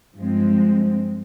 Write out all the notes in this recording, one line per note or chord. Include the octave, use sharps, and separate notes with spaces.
G2 F3 G#3 C4